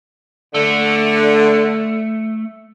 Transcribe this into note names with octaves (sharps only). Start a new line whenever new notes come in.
D3 A3